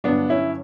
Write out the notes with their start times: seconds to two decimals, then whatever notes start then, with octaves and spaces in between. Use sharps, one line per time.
0.04 G2 D3 F#3 B3 D4
0.29 C#4 E4